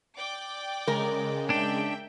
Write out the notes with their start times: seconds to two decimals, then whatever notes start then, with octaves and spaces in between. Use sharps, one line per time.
0.17 D5 G5 D6
0.87 C#3 G#3 A#4
1.50 D4 E5 G5